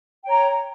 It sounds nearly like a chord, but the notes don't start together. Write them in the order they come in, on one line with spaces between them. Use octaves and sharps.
G5 C#5 A#5